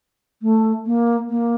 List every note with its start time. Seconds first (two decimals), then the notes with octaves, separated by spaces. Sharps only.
0.42 A3
0.86 A#3
1.30 A#3